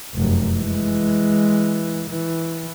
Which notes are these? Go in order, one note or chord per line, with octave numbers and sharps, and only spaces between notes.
F1 F#2
E3 G#3
E3